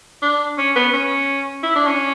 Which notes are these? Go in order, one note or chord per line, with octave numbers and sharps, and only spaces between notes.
D4
C#4
B3
C#4
E4
D4
C#4